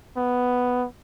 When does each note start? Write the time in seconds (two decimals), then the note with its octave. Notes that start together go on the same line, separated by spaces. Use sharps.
0.17 B3